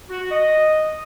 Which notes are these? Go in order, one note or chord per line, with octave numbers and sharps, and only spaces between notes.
F#4
F#4
D#5